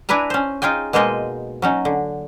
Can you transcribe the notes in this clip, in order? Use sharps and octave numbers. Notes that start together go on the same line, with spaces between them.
D4 E4 B4 G#5 A#5
C#4 C5
D#4 F4 G#4 G5 G#5
B2 G#3 A#3 C5 D#5 G#5
F#3 C#4 D#4
D3